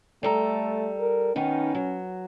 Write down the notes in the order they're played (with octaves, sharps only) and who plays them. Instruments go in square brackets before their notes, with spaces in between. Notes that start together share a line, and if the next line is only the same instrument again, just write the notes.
[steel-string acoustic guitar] G3 A4 A#5 [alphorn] A3
[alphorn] A#4
[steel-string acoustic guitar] D#3 B3 D#4 [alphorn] C#4
[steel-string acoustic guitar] F#3